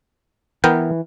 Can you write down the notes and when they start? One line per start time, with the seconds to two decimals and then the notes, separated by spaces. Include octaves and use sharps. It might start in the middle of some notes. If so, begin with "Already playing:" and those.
0.64 E3 B3 A#4 G5